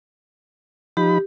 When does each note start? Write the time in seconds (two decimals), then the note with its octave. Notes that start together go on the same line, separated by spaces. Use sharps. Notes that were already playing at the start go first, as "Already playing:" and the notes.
0.97 F3 D#4 G4 B5